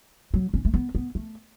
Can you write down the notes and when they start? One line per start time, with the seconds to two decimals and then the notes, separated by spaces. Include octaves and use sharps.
0.34 F#3
0.54 C#4
0.65 A3
0.74 B3
0.95 B3
1.15 A3